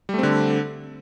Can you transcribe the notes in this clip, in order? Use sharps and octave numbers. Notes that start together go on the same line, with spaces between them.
D3 G3 A3 C4